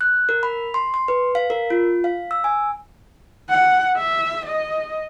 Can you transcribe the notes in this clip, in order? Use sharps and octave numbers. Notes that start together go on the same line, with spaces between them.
F#6
A#4
B5
C6
C6
B4
F5
A#4
F4
F5
E6
G#5
F#5
E5
D#5